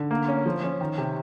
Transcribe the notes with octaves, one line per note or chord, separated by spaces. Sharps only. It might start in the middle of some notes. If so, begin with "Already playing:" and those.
Already playing: D3
A#3
C#4
F3
C#4
D#3
C3